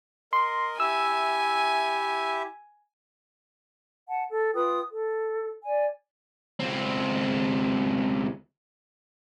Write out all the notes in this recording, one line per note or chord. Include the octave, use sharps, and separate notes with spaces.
A#4 D#5 C6
E4 G4 E5 G#5 E6
F#5 A5
A4
F4 B4 G5 D#6
A4
D5 G#5
C#2 C4